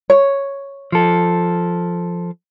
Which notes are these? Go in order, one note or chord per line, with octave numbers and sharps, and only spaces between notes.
C#5
F3 A4